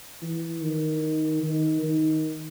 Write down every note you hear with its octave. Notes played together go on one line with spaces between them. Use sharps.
E3
D#3
D#3
D#3